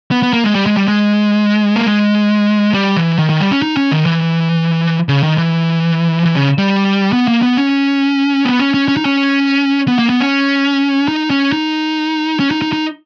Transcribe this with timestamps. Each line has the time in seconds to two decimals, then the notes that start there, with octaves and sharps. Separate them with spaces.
0.11 B3
0.23 B3
0.33 A#3
0.44 G#3
0.55 G3
0.66 G#3
0.77 G3
0.88 G#3
1.76 A#3
1.87 G#3
2.74 G3
2.97 E3
3.18 D#3
3.29 D#3
3.40 G3
3.51 C#4
3.62 D#4
3.77 C#4
3.92 D#3
4.06 E3
5.09 C#3
5.23 D#3
5.38 E3
6.26 E3
6.36 C#3
6.58 G3
7.13 B3
7.28 A#3
7.42 B3
7.57 C#4
8.45 B3
8.59 C#4
8.74 C#4
8.88 C#4
8.97 D#4
9.05 C#4
9.88 B3
9.99 A#3
10.10 B3
10.20 C#4
11.08 D#4
11.30 C#4
11.52 D#4
12.40 C#4
12.51 D#4
12.62 D#4
12.73 D#4